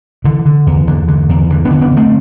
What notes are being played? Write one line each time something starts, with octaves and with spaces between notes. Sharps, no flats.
D3 E3
D3
E2
E2 D3
D3
E2
D3 E3
B3 D4
D3
B3 D4
D3
A3 C4